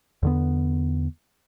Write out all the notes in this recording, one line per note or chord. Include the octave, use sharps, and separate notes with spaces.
E2 D3 B3